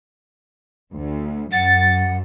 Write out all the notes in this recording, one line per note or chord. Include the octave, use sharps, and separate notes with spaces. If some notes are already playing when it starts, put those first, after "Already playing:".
D2
F#2 F#5 A6